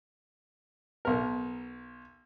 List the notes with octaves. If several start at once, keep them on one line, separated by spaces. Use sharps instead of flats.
B1 A#4